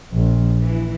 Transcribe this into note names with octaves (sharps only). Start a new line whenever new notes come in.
A#1
E3